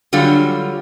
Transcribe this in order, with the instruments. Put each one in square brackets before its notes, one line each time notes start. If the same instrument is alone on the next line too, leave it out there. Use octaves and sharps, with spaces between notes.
[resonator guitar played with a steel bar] D3 F#3 G3 F4